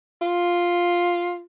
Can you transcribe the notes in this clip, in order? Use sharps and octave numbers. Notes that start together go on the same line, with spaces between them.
F4